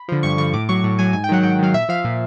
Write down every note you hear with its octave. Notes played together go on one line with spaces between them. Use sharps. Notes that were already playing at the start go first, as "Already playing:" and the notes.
Already playing: B5
D3 F3
G2 C#6
D3 F3 C#6
A2 D6
F#3 C#6
A2
F#3 G#5
G#2 G#5
G5
D#3 F#3 F#5
G#2 G5
D#3 F#3 F5
A#2 E5
F3 F5
A#2